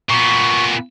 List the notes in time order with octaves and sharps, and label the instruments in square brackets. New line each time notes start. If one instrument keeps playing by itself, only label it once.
[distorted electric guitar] A#2 B3 [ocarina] C#6